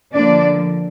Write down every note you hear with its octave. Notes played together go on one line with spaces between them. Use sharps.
D3 F3 A#3 D4 D5